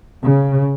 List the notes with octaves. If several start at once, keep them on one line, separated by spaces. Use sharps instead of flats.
C#3